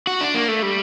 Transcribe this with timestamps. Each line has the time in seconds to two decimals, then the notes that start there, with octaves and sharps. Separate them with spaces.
0.07 F#4
0.21 D4
0.34 A#3
0.48 A3
0.62 G3